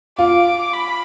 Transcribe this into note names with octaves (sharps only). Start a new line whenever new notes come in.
F4 D6
B5